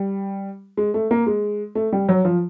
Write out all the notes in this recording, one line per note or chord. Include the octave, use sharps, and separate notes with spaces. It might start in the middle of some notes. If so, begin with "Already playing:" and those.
Already playing: G3
G#3
A3
A#3
G#3
A3
G3
F#3
F3